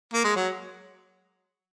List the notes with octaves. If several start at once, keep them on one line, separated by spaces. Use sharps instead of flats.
A#3
G#3
F#3